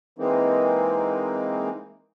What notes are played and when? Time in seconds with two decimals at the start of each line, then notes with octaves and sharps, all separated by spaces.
0.18 E3 G#3 A#3 C4 D#4